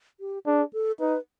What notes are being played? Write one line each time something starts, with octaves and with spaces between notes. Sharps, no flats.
G4
D4 G#4
A4
D#4 B4